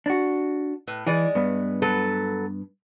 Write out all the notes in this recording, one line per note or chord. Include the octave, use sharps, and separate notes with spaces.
D4 F#4
A2 B4
E3 G#3 D5 G#5
G2 B3
F#3 A4 B4